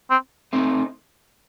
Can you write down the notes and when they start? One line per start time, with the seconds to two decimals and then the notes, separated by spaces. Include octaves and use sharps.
0.11 C4
0.53 A3 C4 D#4